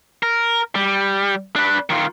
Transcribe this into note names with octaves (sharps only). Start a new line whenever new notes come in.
A#4
G3
D4 B4
D#3 F4